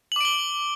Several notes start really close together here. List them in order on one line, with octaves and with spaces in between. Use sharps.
F#7 D6 D7 G7